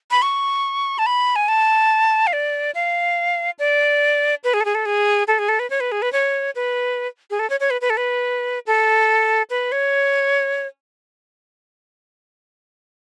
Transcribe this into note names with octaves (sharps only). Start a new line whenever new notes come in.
B5
C#6
A5
B5
G#5
A5
F5
D5
F5
D5
B4
G#4
A4
G#4
A4
G#4
A4
G#4
A4
B4
C#5
B4
G#4
B4
C#5
B4
G#4
A4
C#5
C#5
B4
B4
A4
B4
A4
B4
C#5